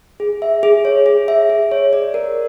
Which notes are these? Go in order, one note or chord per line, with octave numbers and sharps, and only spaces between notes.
G#4
E5
G#4
C#5
G#4
E5
G#4
C#5
D5
A#4